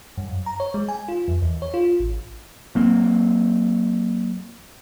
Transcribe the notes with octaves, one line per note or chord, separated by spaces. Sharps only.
G2
F#2
A#5
C#5
G#3
G#5
F4
F2
E2
C#5
F4
A1
F#3 A#3 C4